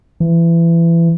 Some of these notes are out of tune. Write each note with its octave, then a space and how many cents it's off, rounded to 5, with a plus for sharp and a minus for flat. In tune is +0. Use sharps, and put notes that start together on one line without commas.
E3 +25